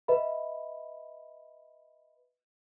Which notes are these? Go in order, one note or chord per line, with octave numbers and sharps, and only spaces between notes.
B4 D#5 E5 B5